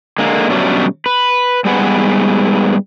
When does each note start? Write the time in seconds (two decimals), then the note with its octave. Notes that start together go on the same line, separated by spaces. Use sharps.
0.18 D3 G#3 A#3
0.49 B2 D3 F#3 G3 A3 C#4
1.06 B4
1.65 G#2 G3 B3 G#4 B4 F#5